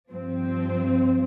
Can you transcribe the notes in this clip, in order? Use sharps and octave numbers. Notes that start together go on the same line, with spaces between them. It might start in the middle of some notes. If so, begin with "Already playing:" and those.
G2 F3 C4